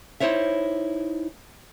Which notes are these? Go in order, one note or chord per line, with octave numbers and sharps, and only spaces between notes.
D#4 E4 C5 C#5 E5